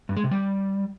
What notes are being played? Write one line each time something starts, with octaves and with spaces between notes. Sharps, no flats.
G2
G#3
C3
G3